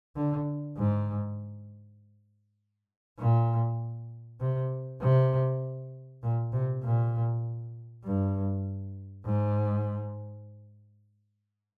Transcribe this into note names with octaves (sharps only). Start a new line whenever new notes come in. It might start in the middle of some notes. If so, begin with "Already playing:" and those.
D3
G#2
A#2
C3
C3
A#2
C3
A#2
G2
G#2